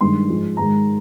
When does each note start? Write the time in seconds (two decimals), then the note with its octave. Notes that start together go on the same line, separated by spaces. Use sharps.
0.01 G2 D#3 G#3 C6
0.29 G#2 F3 G#3
0.57 G#2 D#3 G#3 A#5